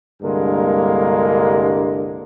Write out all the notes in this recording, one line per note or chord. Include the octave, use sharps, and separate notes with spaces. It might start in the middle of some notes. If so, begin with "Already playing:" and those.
C2 G2 D3 G#3 A#3 A#4